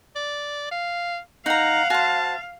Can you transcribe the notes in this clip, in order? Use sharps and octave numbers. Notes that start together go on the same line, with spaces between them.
D5
F5
D#4 F5 F#5 A#5
F#4 C5 A5